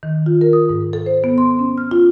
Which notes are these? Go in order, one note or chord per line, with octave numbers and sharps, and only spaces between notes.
D#3
F4
A#4
D#6
G#2
A4
C5
B3
C6
C#4
F6
F4